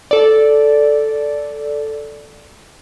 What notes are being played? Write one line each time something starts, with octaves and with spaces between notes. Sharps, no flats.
A4 D5